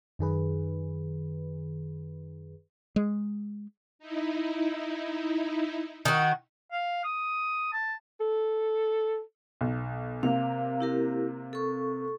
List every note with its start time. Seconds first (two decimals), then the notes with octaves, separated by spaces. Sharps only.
0.19 F#2 D#3 G#4 B4
2.96 G#3
3.99 D#4 E4
6.05 D#3 F#4
6.72 F5
7.04 D#6
7.73 A5
8.20 A4
9.61 B1
10.23 C3 A#3 F5
10.80 E4 G4 A#4
11.53 A4 C#6